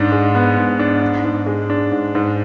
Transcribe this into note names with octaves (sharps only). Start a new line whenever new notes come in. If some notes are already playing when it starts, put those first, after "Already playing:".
Already playing: G#2 D4
G#3
B3
G#2
D4
G#2
G#2
G#3
D4
G#2
G#2